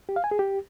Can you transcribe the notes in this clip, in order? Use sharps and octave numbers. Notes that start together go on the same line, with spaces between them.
G4
F5
G#5
G#4
G4